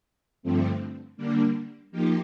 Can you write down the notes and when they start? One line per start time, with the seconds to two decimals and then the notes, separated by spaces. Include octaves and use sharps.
0.43 G2 D3 F3 A3 C4
1.17 D3 G3 A#3 D4
1.91 F3 A#3 D#4 G4